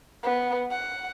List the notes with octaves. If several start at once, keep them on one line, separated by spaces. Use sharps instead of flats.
B3
F#5